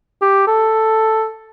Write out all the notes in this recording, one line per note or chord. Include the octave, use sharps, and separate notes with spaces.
G4
A4